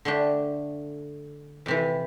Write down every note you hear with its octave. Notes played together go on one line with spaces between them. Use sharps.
D3 A3 D4 G4
F2 C3 E3